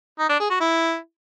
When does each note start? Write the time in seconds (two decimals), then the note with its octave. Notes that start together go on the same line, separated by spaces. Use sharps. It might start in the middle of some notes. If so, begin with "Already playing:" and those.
0.19 D#4
0.29 D4
0.40 G#4
0.50 F#4
0.60 E4